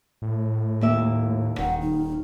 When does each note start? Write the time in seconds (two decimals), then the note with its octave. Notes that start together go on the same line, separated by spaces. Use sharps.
0.22 A2
0.81 D#2 A#3 E5
1.58 D#1 D#3 F#5
1.81 D#4